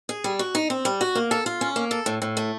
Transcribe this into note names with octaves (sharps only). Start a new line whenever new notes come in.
G#4
G3
F#4
D#4
C4
G3
F#4
A#3
A4
F4
C#4
A#3
A4
A2
A2
A3